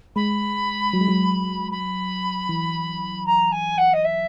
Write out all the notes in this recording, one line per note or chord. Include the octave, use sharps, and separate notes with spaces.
G#3 B5
F#3
G#3
F#3
B5
E3
A#5
G#5
F#5
D#5
E5